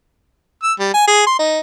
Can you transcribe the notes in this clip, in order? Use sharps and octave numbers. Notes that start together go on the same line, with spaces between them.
E6
G3
G#5
G#4
C6
D#4